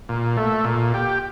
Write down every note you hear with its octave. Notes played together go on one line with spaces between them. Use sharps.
A#2
A3
A#2
G4